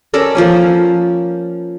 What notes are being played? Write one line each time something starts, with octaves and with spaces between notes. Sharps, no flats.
C#4 A4 A#4 D5
F3 A#3 C#4